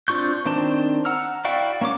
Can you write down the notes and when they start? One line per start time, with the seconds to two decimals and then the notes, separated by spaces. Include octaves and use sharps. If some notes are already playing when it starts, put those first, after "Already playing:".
0.08 C4 D4 F4 C#6 G6
0.46 D#3 C4 D4 C5 A5
1.05 F#5 A#5 E6 F6
1.45 E4 F#4 D5 F5 G5
1.81 A#3 C#4 C#5 D6